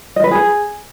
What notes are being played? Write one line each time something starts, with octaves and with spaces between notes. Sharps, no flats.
D#5
B4
G#4